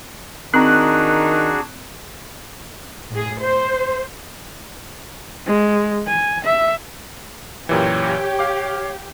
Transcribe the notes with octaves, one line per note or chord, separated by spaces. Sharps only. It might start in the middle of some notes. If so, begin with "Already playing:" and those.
D#3 C4 D4 F#4 G#4 A#5 F#6
A2 G#4
C5
G#3
G#5
E5
F#2 A#2 E3 G4 C#5
F5 D6